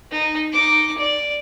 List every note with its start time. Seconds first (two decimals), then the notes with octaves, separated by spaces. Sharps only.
0.11 D#4
0.52 D#4 D6
0.98 D5